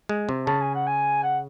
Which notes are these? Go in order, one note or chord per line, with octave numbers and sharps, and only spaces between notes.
G#3
C3
C#3 A5
G#5
F#5
G#5
F#5